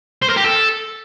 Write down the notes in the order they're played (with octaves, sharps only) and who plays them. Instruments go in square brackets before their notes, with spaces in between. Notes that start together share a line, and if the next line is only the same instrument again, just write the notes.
[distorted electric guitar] C5
A#4
G4
A4